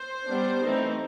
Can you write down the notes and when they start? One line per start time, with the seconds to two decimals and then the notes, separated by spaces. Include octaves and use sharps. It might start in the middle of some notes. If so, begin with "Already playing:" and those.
Already playing: C5
0.26 G3 B3 D4
0.61 E3 A3 C4 D#4